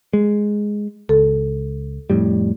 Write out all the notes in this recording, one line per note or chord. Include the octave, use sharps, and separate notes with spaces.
G#3
C#2 A4
F2 A2 G3